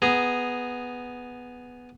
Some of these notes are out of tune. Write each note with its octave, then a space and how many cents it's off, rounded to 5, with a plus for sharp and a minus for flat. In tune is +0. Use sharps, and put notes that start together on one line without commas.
B3 +0 G#4 +0 A#5 +0